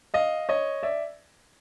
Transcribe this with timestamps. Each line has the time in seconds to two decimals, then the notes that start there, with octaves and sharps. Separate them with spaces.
0.14 D#5 F5
0.49 C#5 D#5
0.83 D5 E5